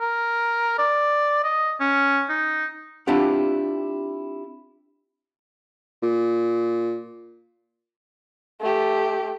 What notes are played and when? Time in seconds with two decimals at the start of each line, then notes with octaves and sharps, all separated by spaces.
0.01 A#4
0.79 D5
1.44 D#5
1.81 C#4
2.29 D#4
3.07 C4 D4 E4 F4 G4 F#5
6.03 A#2
8.61 A3 G4